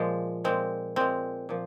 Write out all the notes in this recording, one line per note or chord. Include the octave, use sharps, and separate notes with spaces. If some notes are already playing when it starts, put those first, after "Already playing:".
Already playing: A#2 F3 G#3
A#2 G#3 C4
A#2 G#3 C4
A#2 F3